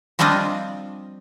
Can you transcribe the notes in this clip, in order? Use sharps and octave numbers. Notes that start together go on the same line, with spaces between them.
F3 G3 C4 D4 F4 D#5